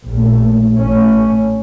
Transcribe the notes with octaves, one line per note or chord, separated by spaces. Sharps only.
A#1 A#2 A3
A1 A2 A3 C#4